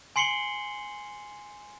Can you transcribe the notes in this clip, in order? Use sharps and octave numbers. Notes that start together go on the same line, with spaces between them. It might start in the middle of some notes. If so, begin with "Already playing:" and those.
G#5 C6 C7 C#7 F#7 G7